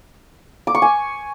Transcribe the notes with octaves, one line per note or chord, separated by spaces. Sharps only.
D6
C#6
G#5